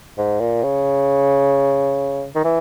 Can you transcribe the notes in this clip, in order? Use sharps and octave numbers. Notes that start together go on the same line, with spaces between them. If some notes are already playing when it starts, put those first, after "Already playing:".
G#2
A#2
C#3
D#3
E3